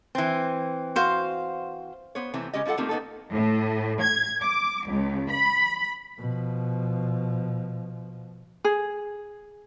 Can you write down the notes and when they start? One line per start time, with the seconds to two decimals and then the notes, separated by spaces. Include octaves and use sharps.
0.15 E3 C4
0.96 F#4 C5 F5
2.15 B3 C5 C#5
2.34 C3 E3 A3 C4
2.53 C#3 G#3 C#4 G4 D#5
2.65 G3 C#4 F4 A4 F#5
2.77 A3 A#3 C4 D#4 F4 G4
2.89 A#3 B3 D#4 G4 A4
3.32 A2
4.01 G#6
4.42 D6
4.87 C#2
5.29 B5
6.19 B2 F3
8.64 G#4